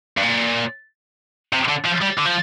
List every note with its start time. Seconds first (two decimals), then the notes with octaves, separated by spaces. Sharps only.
0.18 G2
0.23 A#2
1.53 C3
1.69 D3
1.86 F3
2.02 G3
2.18 D3
2.26 F3